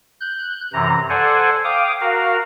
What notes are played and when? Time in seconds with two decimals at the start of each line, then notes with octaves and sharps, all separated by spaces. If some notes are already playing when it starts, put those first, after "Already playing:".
0.21 F#6 G6
0.73 F#2 C3 E3 A#5
1.09 A4 C5 D5 F#5 G#5
1.64 F5 G5 D6 D#6
2.01 F#4 A#4 F5